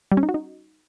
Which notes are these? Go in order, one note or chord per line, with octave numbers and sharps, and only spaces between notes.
G3
C#4
D#4
F#4
D#4